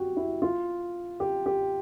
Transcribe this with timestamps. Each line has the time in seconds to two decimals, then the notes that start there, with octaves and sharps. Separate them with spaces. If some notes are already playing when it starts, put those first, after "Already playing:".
Already playing: F#4 G4
0.17 E4
0.42 F4
1.20 G4
1.46 G4